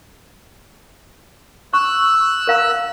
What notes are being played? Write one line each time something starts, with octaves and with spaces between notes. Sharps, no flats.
C#6 E6 F#6
A#4 F5 A#5